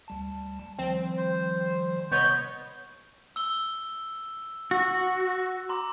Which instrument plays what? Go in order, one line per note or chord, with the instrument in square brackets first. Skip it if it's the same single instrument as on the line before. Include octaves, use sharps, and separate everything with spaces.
[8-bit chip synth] D2 G3 A5
[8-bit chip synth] D#3 F3 G3 [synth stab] C4
[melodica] C5
[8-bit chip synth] C3 [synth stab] B3 C#5 [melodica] D#5 B5 C#6 [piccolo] G6
[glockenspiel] E6 G7
[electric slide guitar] F#4 [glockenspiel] E6
[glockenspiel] A#5 C6 D6